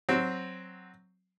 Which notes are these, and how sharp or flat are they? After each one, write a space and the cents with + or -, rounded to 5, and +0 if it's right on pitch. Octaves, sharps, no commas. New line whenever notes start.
F#3 +0 C4 +0